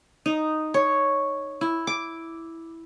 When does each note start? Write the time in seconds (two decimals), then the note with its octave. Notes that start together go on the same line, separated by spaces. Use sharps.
0.26 D#4
0.74 C#5
1.61 E4
1.87 D6